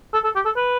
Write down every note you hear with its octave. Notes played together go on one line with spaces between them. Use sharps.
A4
A4
G4
A4
B4